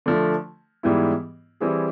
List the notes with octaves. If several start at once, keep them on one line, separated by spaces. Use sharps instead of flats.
D3 F3 A3
G#2 E3 G3 B3 E4
E3 G3 C4 E4 G#4